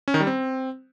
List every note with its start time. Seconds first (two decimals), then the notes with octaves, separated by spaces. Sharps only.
0.08 C#4
0.14 D#3
0.20 G3
0.27 C4